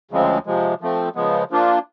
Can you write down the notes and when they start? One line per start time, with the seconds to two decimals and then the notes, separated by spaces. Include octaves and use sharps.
0.11 D2 C#3 F3 G#3 C4
0.46 C3 F3 G#3
0.81 F3 A3 C4
1.15 C#3 F3 G#3 B3
1.51 F3 A#3 D4 F4